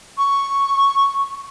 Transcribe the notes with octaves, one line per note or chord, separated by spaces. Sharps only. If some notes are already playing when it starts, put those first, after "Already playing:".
C#6